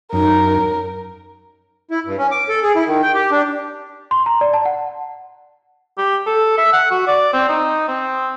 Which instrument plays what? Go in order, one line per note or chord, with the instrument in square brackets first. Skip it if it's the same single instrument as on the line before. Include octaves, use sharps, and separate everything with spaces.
[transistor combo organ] F#2 [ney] D#4 [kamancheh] A#4
[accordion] E4
G2
C#4
D6
A4
G#4
E4
D#3
G5
G4
D4
[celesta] C6
A#5
D5
A5
F#5
[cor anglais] G4
A4
E5
F#5
F#4
D5
C4
D#4
C4